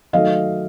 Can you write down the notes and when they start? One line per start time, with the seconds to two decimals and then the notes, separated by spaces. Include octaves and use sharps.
0.13 D#3 F#3 A3 D#5 F5